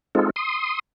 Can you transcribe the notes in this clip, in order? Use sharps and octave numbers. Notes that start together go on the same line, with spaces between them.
G#3 C4 D#4 F4 A4
C6 D#6